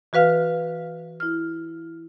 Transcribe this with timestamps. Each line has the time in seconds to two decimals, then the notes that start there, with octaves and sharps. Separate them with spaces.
0.13 E3 F#4 B4 F5 F6
1.20 E4 F6